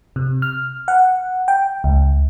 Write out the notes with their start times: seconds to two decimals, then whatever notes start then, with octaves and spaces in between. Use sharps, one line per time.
0.16 C3
0.42 F6
0.88 F#5
1.48 G5
1.84 C#2